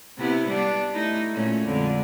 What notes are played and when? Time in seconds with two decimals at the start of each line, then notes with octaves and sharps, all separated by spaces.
0.17 C3 B3 E4
0.47 G3 B3 D4
0.92 A3 D#4 E4
1.34 A#2 A3 C#4
1.65 F2 D3 G#3